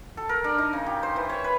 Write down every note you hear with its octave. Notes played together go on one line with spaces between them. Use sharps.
A4
A#4
D4
D#4
C#3
G4
C5
E3
C#5
B4